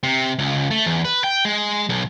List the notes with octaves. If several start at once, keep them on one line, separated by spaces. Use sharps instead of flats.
C3
C#2
A3
E2
B4
G5
G#3
B1